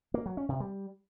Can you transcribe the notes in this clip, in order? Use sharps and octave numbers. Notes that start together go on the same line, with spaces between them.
A#3
F#3
C#4
C3
G3